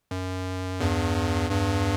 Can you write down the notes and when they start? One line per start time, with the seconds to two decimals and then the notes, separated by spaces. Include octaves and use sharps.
0.11 F#2
0.80 E2 G2
1.51 E2 G2